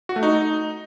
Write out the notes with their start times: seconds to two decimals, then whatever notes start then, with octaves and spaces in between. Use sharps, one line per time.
0.09 F#4
0.16 A3
0.23 D#4